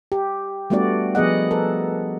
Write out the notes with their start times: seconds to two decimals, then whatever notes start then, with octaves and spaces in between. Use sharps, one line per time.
0.12 G4
0.70 G3 A3 B3 D4 F#4 D5
1.15 F3 B3 G#4 D#5 F#5
1.51 A4 A#4